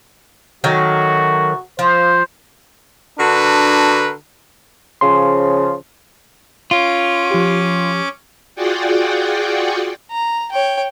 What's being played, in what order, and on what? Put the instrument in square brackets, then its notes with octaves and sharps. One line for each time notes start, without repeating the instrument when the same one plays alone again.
[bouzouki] D#3 F#3 A3 [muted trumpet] F#4
[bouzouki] F3 [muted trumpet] C5
[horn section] D3 D4 F#4 A#4 B4
[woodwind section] C#3 F3 [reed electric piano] C6
[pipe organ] C#4 D6 [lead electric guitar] F4
[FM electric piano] F3 G4
[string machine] F4 F#4 G#4 D5 F#5 G5
[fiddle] A#5
C#5 G5